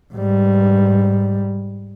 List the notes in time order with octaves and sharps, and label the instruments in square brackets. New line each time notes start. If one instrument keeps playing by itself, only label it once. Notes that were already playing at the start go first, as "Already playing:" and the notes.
[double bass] G#2 G3